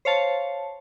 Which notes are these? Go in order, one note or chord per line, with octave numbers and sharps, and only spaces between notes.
C5 C#5 F5 A5